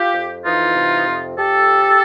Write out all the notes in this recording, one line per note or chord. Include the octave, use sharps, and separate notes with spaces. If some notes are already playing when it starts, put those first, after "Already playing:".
Already playing: F4 G4
F2
E3 D#4 F4
C3
F2
F2 G4 A4